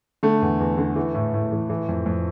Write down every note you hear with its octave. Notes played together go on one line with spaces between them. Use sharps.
D3 A3
E2
E2
D3
E3
A2
A2
E3
E3
F2
F2